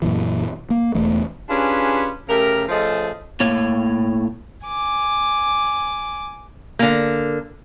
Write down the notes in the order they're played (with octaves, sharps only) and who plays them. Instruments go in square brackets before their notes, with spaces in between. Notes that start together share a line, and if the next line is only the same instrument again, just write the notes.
[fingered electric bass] F#2 A#2 E3
A#3
E1 E2 A3
[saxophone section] C#4 D4 F4 G4 G#4 B4
C#3 A3 G4 A#4
F3 A3 C#4 G#4 A4 D#5
[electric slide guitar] A2 A#3 C#5
[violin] G#5 D6
[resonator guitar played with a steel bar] D3 A#3